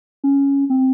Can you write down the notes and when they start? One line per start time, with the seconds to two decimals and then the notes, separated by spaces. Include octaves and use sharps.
0.24 C#4
0.70 C4